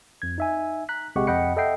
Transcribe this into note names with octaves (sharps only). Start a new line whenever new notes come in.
F2 G#6
D#4 E5 G#5
A#5 F#6 B6
A#1 C3 G#3 G4 F#5 C#6
F2 D#5 F#5 G5 B5 C#7
A4 D#5 E5 F#5 G5 C7